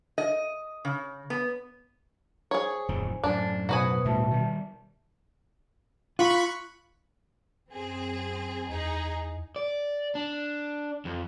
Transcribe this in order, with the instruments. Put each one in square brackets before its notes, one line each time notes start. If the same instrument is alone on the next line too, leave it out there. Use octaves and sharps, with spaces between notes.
[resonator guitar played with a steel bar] D#5
C#3
B3
[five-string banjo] G#4 C#5 [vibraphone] C5 G#5
[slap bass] D1 F2 D#3
[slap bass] F#2 A2 [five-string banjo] D4
[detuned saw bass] B2 [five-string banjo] F#4 B4 G#5 [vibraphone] C5 D#6
[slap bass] D2 A2 G3 [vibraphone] E5 A5
[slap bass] D#3 G3
[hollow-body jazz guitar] F4 [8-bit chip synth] B5 C#6 F#6
[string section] F#2 C4 G#4
[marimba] E2 [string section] D#4 G#4
[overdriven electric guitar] D5
D4
F2